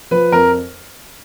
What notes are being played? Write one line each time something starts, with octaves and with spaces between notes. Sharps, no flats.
F3 B4
F2 A#4